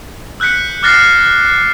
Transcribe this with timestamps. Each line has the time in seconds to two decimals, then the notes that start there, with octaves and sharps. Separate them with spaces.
0.40 E6 F#6 G6 B6 C#7
0.83 D6 F6 F#6 A6 A#6 C7